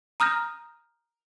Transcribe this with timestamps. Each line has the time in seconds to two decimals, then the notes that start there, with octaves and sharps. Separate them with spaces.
0.20 A#5 D#6 F6 G6 A#6